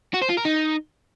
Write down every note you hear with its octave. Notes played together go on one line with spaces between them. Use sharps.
F#4
C5
F4
A#4
D#4